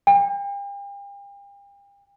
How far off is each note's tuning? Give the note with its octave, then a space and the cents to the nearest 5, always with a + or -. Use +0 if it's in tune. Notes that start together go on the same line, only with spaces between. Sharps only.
G5 +40